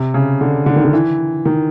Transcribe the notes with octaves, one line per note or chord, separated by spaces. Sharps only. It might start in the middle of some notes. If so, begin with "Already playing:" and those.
Already playing: C3
C#3
D3
D3
D#3
D3
E3
D#3